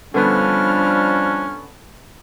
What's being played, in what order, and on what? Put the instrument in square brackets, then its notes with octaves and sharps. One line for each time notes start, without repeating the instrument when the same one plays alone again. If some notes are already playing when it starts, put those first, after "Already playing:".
[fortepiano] D3 B3 [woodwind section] F3 G3 F6 [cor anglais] C#4 [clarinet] D4